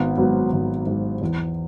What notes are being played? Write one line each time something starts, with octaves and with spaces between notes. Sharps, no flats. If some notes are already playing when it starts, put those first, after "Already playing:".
Already playing: G#1 B3
G#2 F#3 B3
G#1
G#2 F#3
E2